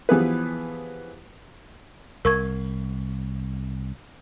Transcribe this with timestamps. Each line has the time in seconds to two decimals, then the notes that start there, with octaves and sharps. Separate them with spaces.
0.09 E3 F3 B3 G4 G#4 B4
2.25 C2 A#4 C#6 G#6